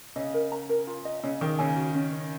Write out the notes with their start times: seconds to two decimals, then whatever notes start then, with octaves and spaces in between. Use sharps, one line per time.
0.16 C#3 D#5
0.34 A#4
0.52 A#5
0.69 A#4
0.87 F4
1.05 D#5
1.23 C#3 D#5
1.41 D#3 G#4
1.59 C#3 G#5
1.76 F#4
1.94 C#4
2.13 C#5